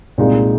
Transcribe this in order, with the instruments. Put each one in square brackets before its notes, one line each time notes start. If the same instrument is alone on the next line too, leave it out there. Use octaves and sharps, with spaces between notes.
[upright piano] C2 A#2 G#3 D#4